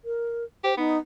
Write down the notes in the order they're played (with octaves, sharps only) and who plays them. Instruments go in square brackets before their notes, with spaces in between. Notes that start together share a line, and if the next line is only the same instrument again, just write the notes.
[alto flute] A#4
[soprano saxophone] G4 [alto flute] C5
[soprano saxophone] B3 [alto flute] D#4